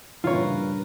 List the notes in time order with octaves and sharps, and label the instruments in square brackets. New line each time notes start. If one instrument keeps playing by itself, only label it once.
[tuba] G2 [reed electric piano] A#2 C#3 E3 [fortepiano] F4 C#5 [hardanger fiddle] A#4 B4